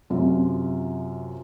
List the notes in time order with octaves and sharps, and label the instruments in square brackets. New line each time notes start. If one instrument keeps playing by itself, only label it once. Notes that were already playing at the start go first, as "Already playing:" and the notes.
[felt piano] F#2 C3 F4